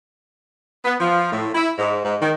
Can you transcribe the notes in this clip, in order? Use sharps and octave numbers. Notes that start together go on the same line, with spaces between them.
B3
F3
A2
E4
G#2
G#2
D#3